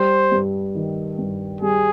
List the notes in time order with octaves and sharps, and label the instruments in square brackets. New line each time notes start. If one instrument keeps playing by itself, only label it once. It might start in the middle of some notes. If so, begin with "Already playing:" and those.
Already playing: [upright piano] G3 [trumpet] C5
[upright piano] G2
D#3
G2
[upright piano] G3 [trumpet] G#4